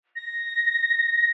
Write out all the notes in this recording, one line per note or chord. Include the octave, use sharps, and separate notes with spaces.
A#6